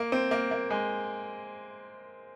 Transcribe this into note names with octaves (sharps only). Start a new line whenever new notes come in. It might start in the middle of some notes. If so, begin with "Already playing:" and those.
Already playing: A#3
C4
A#3
A#3
G#3